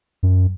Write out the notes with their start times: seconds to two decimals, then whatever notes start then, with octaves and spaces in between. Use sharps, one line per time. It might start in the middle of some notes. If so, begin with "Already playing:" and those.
0.23 F#2